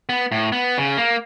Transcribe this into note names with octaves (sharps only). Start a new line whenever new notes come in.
B3
A2
B3
C#3
A#3